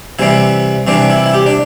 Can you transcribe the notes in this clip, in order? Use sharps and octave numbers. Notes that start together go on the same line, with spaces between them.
C3 E3 G3 C4 E4
C3 E3 G3 C4 D4
E4
E4
G4
D4